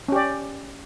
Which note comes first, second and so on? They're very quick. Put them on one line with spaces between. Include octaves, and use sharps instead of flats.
C#4 G4 D5